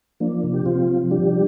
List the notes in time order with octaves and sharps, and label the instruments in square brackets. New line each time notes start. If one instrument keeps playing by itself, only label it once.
[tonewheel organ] F3 A#3 D4
C3
G4
C3 C4 F4
F3
G3 D4 G4